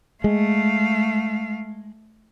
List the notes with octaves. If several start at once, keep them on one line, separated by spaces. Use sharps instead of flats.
G#3 A3 F5